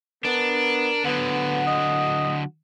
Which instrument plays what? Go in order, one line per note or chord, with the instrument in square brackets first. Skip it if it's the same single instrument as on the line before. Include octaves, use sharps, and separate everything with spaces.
[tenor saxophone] B3 [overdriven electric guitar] D4 [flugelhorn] A#4
[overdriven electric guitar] D3 F#3 [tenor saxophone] B3 [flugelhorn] F#5
[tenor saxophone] D#5